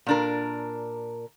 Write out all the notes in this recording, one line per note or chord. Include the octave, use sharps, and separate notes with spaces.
A#2 D4 A#4